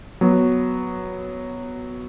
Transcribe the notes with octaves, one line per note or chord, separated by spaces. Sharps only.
F#3 B3 F#4